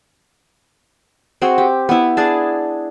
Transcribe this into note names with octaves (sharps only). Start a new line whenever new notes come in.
C4 F#4 G#4 F#5
G4
B3 E4
D4 G#4 A5